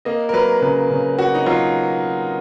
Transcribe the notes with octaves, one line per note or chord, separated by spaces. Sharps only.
A#3 D#5
A#4
F#3 B4
C#3 B4
C#3
A#3 F#4
D#4
F#3 F4